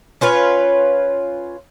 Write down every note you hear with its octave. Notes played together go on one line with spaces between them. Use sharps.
C#4 F4 B4 C#5